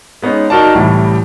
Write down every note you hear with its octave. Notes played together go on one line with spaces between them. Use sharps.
G#3 B3 C#4 D#4
D#4 F#4 A#4 D5 A5
C2 A2 E3 G3